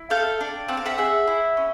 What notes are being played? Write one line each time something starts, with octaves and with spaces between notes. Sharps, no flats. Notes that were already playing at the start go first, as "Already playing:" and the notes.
Already playing: E4
A4 F5 G5
D4
C4 F#5
F5
E5 F#5
G#4 E5 F#5
E4
C#4